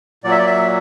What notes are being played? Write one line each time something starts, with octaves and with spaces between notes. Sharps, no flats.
A#2 F#3 D5
E5
D5
E5